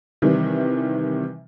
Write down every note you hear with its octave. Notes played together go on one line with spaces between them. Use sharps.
C3 D#3 E3 G3